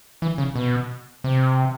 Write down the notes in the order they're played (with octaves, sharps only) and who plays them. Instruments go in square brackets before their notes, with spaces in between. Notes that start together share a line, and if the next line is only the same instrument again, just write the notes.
[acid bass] E3
C#3
B2
C3